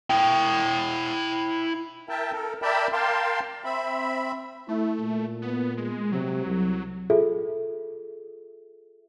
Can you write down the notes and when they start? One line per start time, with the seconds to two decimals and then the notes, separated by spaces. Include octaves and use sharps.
0.10 E4 G5
2.09 A#4 E5 G5 A5
2.32 A4 A#4
2.62 A#4 D5 E5 G5 A5 B5
2.93 A#4 F5 G5 A5 C6
3.65 C4 E5 B5
4.68 A3 E4
5.00 A#2
5.42 B3
5.77 G#3
6.12 C3 F#3
6.47 C2
7.10 F4 G#4 A4 E5